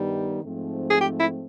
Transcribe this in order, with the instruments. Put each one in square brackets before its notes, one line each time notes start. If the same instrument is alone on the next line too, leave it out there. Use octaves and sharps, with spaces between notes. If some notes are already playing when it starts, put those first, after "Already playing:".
Already playing: [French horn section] G2 D#3 G3 B3 D#4
G#2 F3 A3 C4
[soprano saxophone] G#4
G4
E4